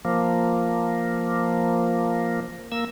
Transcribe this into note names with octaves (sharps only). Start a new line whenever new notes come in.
F3 A#3
A#3 E6